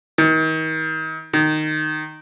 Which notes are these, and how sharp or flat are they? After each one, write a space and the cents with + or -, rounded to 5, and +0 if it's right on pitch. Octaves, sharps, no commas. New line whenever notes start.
D#3 +35
D#3 -10